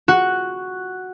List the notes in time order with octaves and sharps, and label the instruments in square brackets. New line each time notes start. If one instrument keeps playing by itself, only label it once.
[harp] F#4